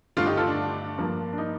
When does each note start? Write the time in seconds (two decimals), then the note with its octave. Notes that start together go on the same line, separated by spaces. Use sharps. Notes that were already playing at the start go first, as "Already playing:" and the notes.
0.17 G2 D3 A3 D4 F4
0.26 D#4 G4
0.37 F4 A4
0.47 D4
0.98 G2 F3 A#3
1.33 D4
1.38 D#4